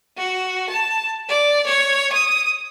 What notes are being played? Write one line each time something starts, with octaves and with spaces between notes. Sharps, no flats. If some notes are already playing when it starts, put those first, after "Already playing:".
F#4
A5
D5
C#5
D#6